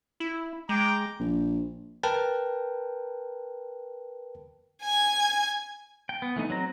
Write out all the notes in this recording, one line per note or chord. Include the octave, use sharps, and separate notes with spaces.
E4
G#3 G5 A#5 D6
A#1
A#4 B4 G5 A5
G#5 G#6
G5
B3
E3 A3 D#4
F#3 C4 A#5